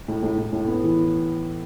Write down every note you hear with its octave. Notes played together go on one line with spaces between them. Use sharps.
A2
A2
A2
A2
B3
E3